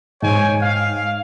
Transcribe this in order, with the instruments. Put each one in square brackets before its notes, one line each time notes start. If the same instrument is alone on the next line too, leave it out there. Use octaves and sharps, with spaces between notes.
[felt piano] G#2 [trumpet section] C#5 G5 G#5
[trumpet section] F5